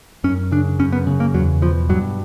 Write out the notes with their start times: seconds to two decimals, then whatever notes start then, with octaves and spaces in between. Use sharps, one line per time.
0.24 F#2 C#4
0.52 C#3 D4
0.79 F#2 C#4
0.93 B3
1.07 C#3
1.20 A#3
1.34 E2 F#3
1.62 B2 F3
1.89 G2 F#3